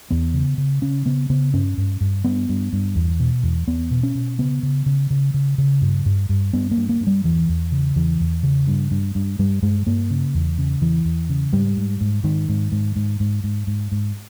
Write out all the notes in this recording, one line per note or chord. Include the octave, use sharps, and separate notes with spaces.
E2 B3
C#3
C#3
C#3 C#4
C#3 B3
C#3 B3
G2 C#4
G2
G2
G2 B3
G2
G2
E2
B2
E2
E2 B3
B2
C#4
B2
C#3 B3
C#3
C#3
C#3
C#3
C#3
G2
G2
G2
G2 B3
A#3
G2
A#3
G2
G3
E2 E3
E2
C#3
E2 E3
E2
C#3
G2
G2
G2
G2 G3
G2 G#3
G2 A#3
C#3
E2
C#3
E2 E3
E2
C#3
G#2 G3
G#2
G#2
G#2 D#3
G#2
G#2
G#2
G#2
G#2
G#2
G#2